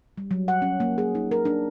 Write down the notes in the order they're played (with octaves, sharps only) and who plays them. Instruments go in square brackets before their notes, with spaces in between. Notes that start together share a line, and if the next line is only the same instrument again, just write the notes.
[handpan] G3
F#3
F#5
C#4
A#3
G#4
D#4
A#4
D4